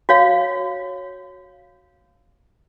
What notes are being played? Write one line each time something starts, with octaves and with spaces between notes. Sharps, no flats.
F#4 C#5 F5